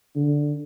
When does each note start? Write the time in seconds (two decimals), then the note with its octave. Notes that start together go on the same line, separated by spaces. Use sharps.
0.16 D3